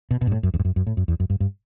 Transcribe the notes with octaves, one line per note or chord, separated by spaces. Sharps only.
B2
B2
G2
A2
F#2
E2
G2
F#2
F#2
A2
F#2
E2
F#2
G2
G2